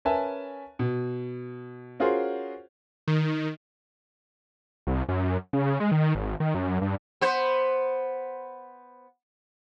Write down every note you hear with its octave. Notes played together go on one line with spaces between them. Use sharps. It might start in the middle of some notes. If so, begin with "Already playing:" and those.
C#4 A#4 B4 E5 G#5 A5
B2
C#4 F4 F#4 G#4 A#4 C5
D#3
C2
F#2
C#3
G#3
D#3
G#1
D#3
F#2
G2
B3 C5